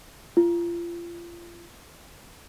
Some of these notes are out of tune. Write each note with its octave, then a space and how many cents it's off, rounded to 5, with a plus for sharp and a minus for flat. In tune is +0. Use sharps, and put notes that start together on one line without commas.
F4 -30